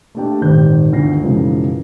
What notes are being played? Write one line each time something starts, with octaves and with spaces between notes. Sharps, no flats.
A3 A#3 D4 G4 G5 A5
D#1 G#1 D#3 G4 C5 G6
G1 D2 B3 A#6 C7
B1 F#2 C#3 E3 F3 G#3